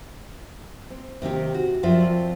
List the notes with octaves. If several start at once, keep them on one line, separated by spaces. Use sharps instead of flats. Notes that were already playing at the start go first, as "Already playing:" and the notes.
C4
C3 D#3 C4 G4
F#4
F#2 F3 C4 F4 D5 E5